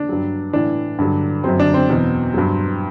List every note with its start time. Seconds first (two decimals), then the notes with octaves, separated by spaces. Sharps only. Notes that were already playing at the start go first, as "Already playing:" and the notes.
Already playing: D4
0.09 G2 F#3
0.53 A2 E3 D4
0.99 G2 D3 F#3
1.44 F#2 D3 F#3 C4
1.60 D4
1.74 C4
1.89 E2 B2 F#3
2.34 G2 F#3